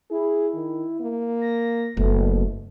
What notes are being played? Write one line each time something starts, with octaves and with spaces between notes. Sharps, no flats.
E4 G#4
D#3
A#3
A#6
F#1 B2 A3